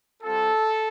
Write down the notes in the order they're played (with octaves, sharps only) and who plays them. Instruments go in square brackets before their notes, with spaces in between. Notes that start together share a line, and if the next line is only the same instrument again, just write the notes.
[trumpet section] G3 C4 F4 A4